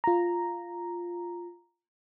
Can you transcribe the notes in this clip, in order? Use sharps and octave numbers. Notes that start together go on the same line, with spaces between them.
F4 A#5